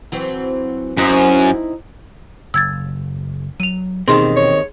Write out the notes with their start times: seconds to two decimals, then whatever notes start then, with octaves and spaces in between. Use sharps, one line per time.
0.12 E3 F#3 C4
0.98 F#2 C4 D#4 E4
2.54 F#1 E6 G#6 A6
3.60 F#3 D#7 F7
4.08 E1 D#2 B2 D#3 C4 C#4 G#4 C6
4.37 C#5